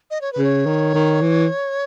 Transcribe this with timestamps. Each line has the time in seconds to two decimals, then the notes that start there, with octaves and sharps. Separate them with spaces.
0.11 D#5
0.21 C#5
0.33 B4
0.38 C#3
0.44 C#5
0.66 D#3
0.94 D#3
1.21 E3